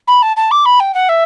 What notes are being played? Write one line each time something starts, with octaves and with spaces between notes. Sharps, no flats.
B5
A5
A5
D6
B5
G5
F#5
E5